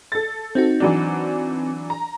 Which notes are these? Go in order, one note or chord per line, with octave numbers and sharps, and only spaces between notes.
A4 A6
C4 D#4 F#4
E3 F#3 D4
A#5